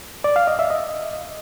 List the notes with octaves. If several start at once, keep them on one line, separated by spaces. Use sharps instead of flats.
D5
F5
D#5
E5
D#5